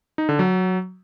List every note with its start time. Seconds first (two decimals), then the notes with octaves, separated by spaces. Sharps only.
0.18 D#4
0.29 D3
0.39 F#3